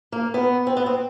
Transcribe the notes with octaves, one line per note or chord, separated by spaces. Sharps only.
A#3
B3
C4
B3
C4